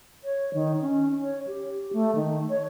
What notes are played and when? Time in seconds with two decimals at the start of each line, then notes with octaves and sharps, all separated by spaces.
0.24 C#5
0.54 D#3
0.81 C#4
1.23 C#5
1.47 G4
1.93 A3
2.15 D#3
2.50 C#5